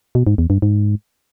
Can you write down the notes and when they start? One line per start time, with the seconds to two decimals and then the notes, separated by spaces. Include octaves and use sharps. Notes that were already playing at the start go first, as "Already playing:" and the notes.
0.15 B2
0.27 G#2
0.38 E2
0.50 G2
0.62 G#2